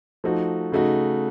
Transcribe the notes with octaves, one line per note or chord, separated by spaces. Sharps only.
F3 A3 D#4 F#4
C#3 A3 D#4 F#4